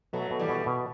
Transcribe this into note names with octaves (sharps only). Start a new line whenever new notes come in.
B2 F#3 A3
B2
E3 G3
B2
B2